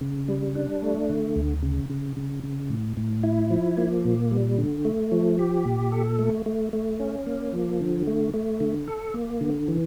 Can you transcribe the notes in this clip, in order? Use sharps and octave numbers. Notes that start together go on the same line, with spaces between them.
C#3
G3
D4
A3
D3
D2
C#3
C#3
C#3
C#3
A2
A2
E4
F3
A#3
A#2
G3
D3
A3
F3
G4
A#2
A4
A3
A3
A3
C#4
A#3
F3
D3
A3
A3
D3
A4
A#3
D3
E3